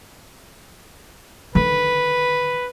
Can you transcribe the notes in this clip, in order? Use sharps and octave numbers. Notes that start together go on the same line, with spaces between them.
D3 D#3 B4